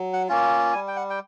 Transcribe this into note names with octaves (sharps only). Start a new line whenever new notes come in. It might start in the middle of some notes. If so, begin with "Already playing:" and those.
Already playing: F#3
F#5
A#3 C#4 F4
G3 G#5
G5
F#5
G5